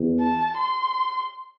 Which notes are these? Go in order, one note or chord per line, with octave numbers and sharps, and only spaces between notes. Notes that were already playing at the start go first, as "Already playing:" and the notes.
Already playing: E2
A5
C6